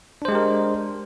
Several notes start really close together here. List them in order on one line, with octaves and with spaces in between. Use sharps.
D4 C5 G#3 G4 A#4